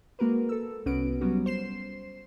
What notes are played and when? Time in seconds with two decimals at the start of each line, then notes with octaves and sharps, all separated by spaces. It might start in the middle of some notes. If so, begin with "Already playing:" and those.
0.19 G#3 A#3 F#4 A#4 B4
0.49 A4 E6
0.86 C2 B3 C#4 F#4 B4 D7
1.21 F#3 G3 B3 C#4 F#4
1.46 C5 C7 E7